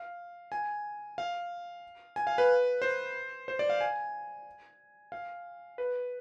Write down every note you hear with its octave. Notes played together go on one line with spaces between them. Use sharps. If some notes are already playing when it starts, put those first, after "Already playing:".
Already playing: F5
G#5
F5
G#5
F5
B4
C5
C5
D5
F5
G#5
F5
B4